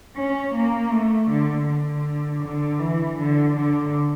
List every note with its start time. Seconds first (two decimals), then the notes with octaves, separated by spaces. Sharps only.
0.16 C#4
0.54 A#3
0.92 A3
1.29 D3
1.67 D3
2.43 D3
2.80 E3
3.18 D3
3.56 D3